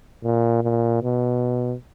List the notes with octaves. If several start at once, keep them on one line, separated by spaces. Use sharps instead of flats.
A#2
A#2
B2